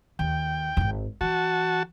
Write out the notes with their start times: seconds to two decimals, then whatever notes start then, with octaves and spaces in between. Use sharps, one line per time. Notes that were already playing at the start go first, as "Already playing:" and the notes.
0.19 D#2 G5
0.77 D1 G#1
1.21 E3 F#4 A5